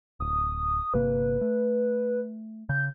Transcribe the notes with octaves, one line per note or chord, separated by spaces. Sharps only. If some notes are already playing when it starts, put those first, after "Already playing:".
D1 D#6
G1 C3 A#3 B4
A3
C#3 G6